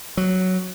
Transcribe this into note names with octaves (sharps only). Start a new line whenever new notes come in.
F#3